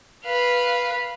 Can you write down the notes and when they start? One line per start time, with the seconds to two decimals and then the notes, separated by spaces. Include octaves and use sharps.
0.25 B4 F5